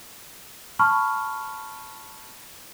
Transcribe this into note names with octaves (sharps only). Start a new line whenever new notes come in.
A5 B5 C#6 F6